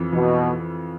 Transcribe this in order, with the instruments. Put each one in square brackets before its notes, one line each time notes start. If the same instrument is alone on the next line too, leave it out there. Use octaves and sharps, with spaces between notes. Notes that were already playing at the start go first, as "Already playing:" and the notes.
Already playing: [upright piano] F2 E3
[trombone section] B2 [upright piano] E3